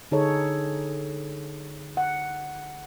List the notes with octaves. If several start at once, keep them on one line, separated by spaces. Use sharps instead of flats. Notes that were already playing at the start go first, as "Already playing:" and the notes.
D3 D#4 G#4 A4 C#5
F#5